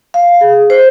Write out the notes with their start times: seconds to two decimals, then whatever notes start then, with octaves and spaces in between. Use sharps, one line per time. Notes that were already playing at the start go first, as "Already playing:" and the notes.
0.14 F5
0.41 G#4
0.70 C5